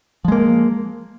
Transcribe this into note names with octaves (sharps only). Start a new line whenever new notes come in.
F3 G#3 A#3